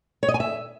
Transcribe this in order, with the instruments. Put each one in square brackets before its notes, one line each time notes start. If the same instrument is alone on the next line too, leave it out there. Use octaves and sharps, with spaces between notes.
[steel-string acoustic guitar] C#5
D#5
G#5
E5